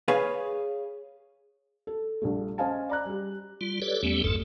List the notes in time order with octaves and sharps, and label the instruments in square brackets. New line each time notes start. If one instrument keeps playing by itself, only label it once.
[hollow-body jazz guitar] G#4 B4 C#5 F5 G#5
[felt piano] A4
A#1 G3 A3
C#4 C5 D#5 F5 G#5 A5
D5 A#5 F#6
G3 G4
[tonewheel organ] G3 F4
G4 A4 B4 C#5 D5
E2 G3 A3 B3 C#4 G4
G#1 F2 G#2 A3 A4